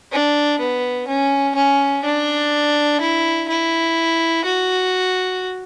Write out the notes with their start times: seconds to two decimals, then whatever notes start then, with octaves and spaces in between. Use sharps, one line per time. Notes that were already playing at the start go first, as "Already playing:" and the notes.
0.12 D4
0.59 B3
1.08 C#4
1.55 C#4
2.04 D4
3.00 E4
3.49 E4
4.45 F#4